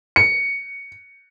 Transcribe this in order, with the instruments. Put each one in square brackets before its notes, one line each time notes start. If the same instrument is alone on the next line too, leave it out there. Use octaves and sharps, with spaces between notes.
[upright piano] C#7